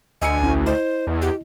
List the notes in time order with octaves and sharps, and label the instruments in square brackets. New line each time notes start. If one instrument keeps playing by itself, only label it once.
[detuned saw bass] D2 [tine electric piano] D#5 E6 C#7 [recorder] G#5
[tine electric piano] A#1 C#4 E4
[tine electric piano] E4 D#5 [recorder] C5
[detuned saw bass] E2
[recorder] G4